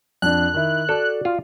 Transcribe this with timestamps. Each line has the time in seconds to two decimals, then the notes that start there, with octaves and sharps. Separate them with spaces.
0.22 F2 D4 F#6
0.54 D#3 E4
0.89 F#4 A4 D5
1.25 F4